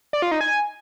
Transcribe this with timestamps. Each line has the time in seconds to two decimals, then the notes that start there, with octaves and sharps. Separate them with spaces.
0.13 D5
0.22 F4
0.31 D#4
0.41 G#5